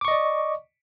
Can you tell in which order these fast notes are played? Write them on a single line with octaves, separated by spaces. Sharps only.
D6 C#6 D#5 D5